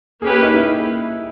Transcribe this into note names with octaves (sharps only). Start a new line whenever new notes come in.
A#3 C#4 G4 G#4 B4
D#4
E4